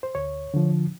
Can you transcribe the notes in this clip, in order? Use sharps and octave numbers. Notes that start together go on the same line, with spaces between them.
C5
D2 C#5
D3 F3